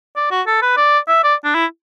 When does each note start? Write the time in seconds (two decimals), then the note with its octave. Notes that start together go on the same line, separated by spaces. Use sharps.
0.16 D5
0.31 F#4
0.47 A4
0.62 B4
0.77 D5
1.08 E5
1.24 D5
1.44 D4
1.54 E4